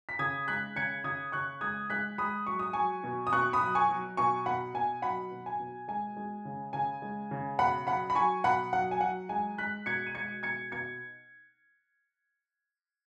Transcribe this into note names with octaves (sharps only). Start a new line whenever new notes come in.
B6
C#3 D#6 G#6
G#3 F#6 B6
C#3 G#6 C#7
C#3 D#6 G#6
C#3 C#6 F#6
G#3 D#6 G#6
G#3 F#6 B6
G#3 B5 D#6
F#3 C#6
D#6
F#3 G#5 C#6
B2
D#6
B2 C#6 F#6
B5 D#6
F#3
G#5 C#6
F#3
B2 G#5 C#6
B2 F#5 B5
B2 G#5
F#3 F#5 B5
B2
G#5
B2
G#3 G#5
G#3
C#3
C#3 G#5
G#3
C#3
B2 F#5 B5
F#3 F#5 B5
B5
F#3 G#5 C#6
B2 F#5 B5
F#3 F#5
G#5
F#3 F#5
G#3 G#5
G#3 F#6 B6
B2 G#6 C#7
D#7
G#3 G#6 C#7
B2 G#6 C#7
B2 G#6 C#7